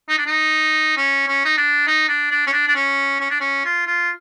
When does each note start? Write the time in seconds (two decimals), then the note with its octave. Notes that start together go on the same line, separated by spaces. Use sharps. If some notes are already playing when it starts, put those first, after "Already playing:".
0.09 D#4
0.18 D4
0.26 D#4
0.97 C#4
1.28 C#4
1.45 D#4
1.58 D4
1.87 D#4
2.08 D4
2.31 D4
2.47 C#4
2.53 D4
2.68 D4
2.76 C#4
3.21 C#4
3.30 D4
3.41 C#4
3.65 F4
3.87 F4